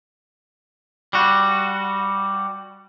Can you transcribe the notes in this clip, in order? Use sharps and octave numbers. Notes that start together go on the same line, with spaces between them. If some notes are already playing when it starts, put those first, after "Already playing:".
G3 F#4